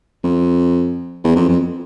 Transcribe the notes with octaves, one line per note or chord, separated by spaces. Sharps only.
F2
E2
F2
F2